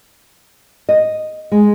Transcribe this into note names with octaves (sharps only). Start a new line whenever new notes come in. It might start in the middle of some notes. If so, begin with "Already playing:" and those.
D#5
G#3